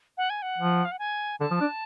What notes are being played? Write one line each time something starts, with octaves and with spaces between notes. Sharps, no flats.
F#5
G#5
F#5
F3
F5
F#5
G#5
D3 A5
F3
D4